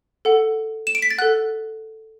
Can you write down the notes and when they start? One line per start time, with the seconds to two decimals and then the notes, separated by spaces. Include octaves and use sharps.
0.25 A4 F#5
0.87 E7
0.95 D7
1.02 B6
1.11 A6
1.18 A4 F#5 F#6